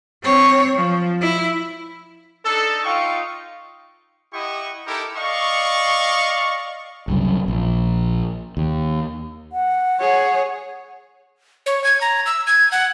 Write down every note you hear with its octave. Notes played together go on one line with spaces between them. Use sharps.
C4 C#5
F3
E4
D4 D#4 A4
D#4 F4 F5 G5 C#6
E4 G4 D#5 F#5 C#6
D#4 E4 G4 A4 A#4
D5 D#5 F5 C#6
F#1 C2 F#2
A#1
D#2
F#5
G#4 C#5
C#5
G#6
A#5
E6
G#6
F#5